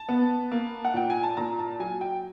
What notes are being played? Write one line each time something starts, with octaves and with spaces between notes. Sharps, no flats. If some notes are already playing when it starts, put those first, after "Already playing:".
Already playing: A5
B3
A#3
F#5
A#2 G5
G#5
A5
A#2 A#5
A5
F#3 G#5
G5